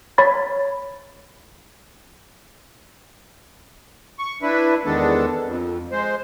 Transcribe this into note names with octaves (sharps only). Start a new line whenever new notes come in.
C#5 B5 A6
C#6
D4 E4 B4
E2 D#3 G#3 B3 D4 A4
F2
G#3 C5